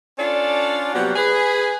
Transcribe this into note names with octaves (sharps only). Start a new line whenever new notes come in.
C#4 D4 F4 A4 D5
C3 F#3 G3 A#3 B3 F#4
G#4 B4